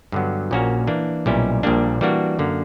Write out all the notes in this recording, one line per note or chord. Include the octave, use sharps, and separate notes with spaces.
G2 D3 F#3 B3
A#1 A#2 A#3 C#4 F#4
E3 A#3 D4
B1 A#2 G3 C#4 E4
A#1 A#2 G3 A#3 D4
E3 G3 A#3 D4 F#4
F#2 D3 A#3